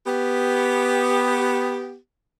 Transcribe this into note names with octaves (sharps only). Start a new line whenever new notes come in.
B3 G4